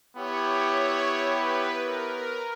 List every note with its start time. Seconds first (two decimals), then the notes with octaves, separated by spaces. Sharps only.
0.15 B3 E4 G4 C#5
0.43 C#5
0.72 C#5
1.28 B4
1.84 A#4
2.12 A#4